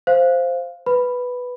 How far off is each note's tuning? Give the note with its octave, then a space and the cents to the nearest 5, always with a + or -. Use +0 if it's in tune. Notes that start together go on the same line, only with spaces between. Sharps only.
C5 +0 F5 -10
B4 +0 B5 +0